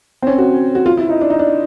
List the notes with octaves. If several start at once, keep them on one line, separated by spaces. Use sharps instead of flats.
C4
C#4
F#4
F#4
F4
E4
D#4
D4
D#4
D4